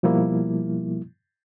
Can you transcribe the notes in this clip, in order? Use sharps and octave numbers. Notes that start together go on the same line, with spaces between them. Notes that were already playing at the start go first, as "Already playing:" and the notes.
B2 F3 G3 A#3 E4